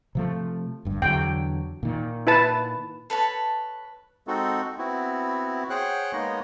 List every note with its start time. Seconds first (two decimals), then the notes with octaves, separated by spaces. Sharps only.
0.15 C3 F3 A3
0.85 G1 G2
1.02 E2 D3 F#3 G5
1.83 A#2 D#3
2.27 E4 B4 A5
3.10 A4 B4 C#5 A5
4.27 G#3 C4 D#4 F#4 A4
4.78 B3 C4 E4 F#4
5.70 G#4 C5 C#5 F#5 G5 F#6
6.13 G#3 A#3 B3 D#4 C#5 D#5